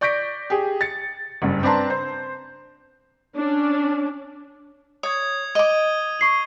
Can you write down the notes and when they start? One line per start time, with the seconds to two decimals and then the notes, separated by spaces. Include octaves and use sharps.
0.01 D5 C#6 G6 A#6 B6 D7
0.50 G4 G#4
0.81 A6 C#7
1.42 F#1 G2
1.63 C4 D4 B4 A5 A#5 C6
1.90 C5
3.35 C#4 D4
5.03 C#5 D#6 G#6
5.55 D#5 D6 D#7 G7
6.19 C#6 C7 F#7